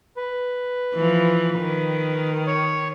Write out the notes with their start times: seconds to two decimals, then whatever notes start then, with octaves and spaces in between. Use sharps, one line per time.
0.17 B4
0.95 E3 F3
1.59 D#3
2.47 C#5